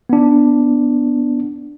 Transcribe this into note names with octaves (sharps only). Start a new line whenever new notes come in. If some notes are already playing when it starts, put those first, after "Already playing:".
B3 D4